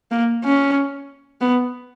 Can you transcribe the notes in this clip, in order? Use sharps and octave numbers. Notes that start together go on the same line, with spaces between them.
A#3
C#4
B3